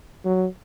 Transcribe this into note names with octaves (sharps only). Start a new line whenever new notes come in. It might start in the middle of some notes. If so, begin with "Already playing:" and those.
F#3